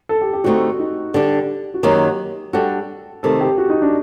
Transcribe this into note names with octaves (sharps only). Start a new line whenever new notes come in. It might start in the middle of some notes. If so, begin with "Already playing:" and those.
A4
G4
G4
D3 A3 C4 D#4 F#4
D#4
D3 G3 D4 G4
F#4
F#2 D#3 F#3 A#3 G4
G3 D4 F#4 A4
C3 D#3 A3 A4
G4
F#4
D#4
D4